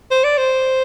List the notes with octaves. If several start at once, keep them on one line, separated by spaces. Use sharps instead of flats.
C5
D5
C5